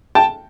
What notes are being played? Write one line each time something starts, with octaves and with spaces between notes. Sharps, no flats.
G5 A5